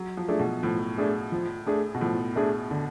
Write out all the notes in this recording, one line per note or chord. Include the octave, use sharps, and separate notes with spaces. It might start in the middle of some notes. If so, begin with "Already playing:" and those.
Already playing: F#3
F3
A3 D4 G#4
B2
A2 F3
A3 D4 G#4
F3
A3 D4 G#4
B2
A2 F3
A3 D4 G#4
D3